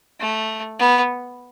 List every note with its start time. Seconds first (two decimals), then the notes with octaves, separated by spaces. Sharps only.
0.20 A3
0.79 B3